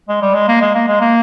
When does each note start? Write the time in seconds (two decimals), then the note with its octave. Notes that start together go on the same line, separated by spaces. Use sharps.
0.09 G#3
0.22 G3
0.34 G#3
0.48 A#3
0.61 G#3
0.75 A#3
0.88 G#3
1.01 A#3